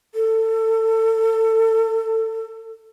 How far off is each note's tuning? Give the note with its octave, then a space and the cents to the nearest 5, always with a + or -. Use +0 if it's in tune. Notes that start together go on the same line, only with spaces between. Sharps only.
A4 +25